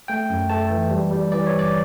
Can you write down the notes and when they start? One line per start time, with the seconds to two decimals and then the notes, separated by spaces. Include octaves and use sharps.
0.08 A3 G5
0.30 F#2
0.49 A3 A5
0.70 E3
0.91 G3
1.11 G3
1.32 E3 D5
1.46 C#5
1.53 G1
1.59 D5